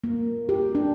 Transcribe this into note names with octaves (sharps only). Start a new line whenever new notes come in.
A#3
G4
D4